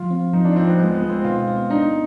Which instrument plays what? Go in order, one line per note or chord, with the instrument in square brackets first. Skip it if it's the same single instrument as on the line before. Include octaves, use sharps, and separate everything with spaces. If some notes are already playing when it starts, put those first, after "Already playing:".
Already playing: [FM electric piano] F3 [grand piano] F4
[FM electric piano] C4
[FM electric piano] F3 [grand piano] D#4
[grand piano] D4
[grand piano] C4 [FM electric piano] F4
[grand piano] B3
[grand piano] G#3 [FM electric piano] F4
[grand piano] B3
[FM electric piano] G#3
[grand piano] C4
[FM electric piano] B2 [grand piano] F4
[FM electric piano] B3
[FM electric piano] D4 [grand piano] D#4